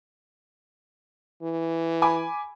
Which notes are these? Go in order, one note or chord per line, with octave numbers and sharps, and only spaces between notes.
E3
G#5 B5 D6